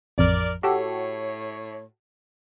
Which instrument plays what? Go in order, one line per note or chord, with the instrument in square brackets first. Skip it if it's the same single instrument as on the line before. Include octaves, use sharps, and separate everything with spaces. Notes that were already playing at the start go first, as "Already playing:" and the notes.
[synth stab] A1 F2 [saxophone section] A#4 D5
[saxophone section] A2 C#5 [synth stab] F#4 G4 A4